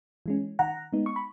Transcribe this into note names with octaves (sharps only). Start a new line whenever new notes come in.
E3 G#3 C#4
D#3 F#5 A#5
G#3 B3 D#4
C#6
B5